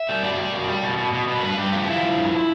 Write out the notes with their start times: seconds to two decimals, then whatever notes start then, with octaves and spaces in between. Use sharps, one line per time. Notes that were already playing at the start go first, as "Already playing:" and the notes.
Already playing: E5
0.09 G3
0.23 B2 D5
0.38 G3
0.53 B2
0.68 G3
0.83 B2
0.98 B2
1.13 B2
1.28 B2
1.43 G2 B4
1.58 G2 G4
1.72 F3 G4
1.88 F3 E4
2.03 F3
2.18 G2